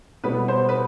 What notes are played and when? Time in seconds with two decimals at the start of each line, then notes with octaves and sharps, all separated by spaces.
0.24 B2 G3 B3 B4
0.48 C5
0.69 B4